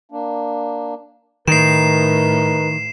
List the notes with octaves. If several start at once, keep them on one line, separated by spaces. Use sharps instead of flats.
A#3 D4
A2 D#3 D#4 A#4 B4 C7 E7